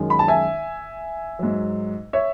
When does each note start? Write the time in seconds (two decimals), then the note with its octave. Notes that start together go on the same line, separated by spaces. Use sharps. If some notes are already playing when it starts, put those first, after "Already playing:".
Already playing: F#2 D#3 G#3
0.10 B5
0.19 A5
0.28 E5 G#5
1.39 G#2 F#3
2.13 C#5 E5